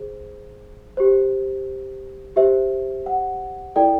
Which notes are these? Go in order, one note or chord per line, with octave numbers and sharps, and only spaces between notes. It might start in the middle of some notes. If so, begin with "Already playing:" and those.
Already playing: G#4 C5
G4 C5
G4 C5 E5
F#5
E4 A4 D5 G5